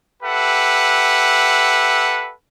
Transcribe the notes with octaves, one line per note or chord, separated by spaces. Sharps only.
G4 A4 B4 E5 F#5